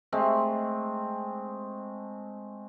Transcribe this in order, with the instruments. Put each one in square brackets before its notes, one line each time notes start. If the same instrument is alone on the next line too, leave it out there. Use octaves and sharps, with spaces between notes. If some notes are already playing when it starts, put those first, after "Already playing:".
[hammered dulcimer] G#3 A3 C4